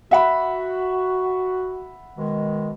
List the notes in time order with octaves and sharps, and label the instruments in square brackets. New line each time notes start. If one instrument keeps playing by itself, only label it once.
[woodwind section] F#4 [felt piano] E5 F#5 B5
[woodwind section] B2 D#3 G#3